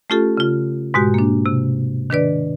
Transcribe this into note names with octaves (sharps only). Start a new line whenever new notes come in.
A3 C#4 F4 G4 A4
C#3 F4
G#2 B2 G#3 F#4 G4
A#3 D4
C3
D#3 D4 B4 D5